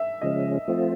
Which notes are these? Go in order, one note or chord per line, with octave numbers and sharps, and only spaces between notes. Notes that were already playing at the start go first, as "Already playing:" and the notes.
Already playing: E5
C#3 F3 G#3 C#4 D#5
F3 A3 C4 F4